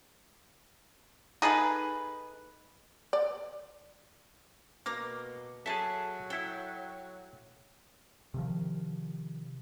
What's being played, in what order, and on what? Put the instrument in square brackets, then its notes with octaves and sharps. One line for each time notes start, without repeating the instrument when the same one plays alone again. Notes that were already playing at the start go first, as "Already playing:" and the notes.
[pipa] D#4 G#4 A4 B4
[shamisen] D5
[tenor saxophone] B2 [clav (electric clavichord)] A#3 [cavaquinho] A#5 D6
[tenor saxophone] F#3 [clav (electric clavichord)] G#4 E5 [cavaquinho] A4 A5
[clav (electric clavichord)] E4 A4 [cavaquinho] G5
[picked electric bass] C3 D#3 F3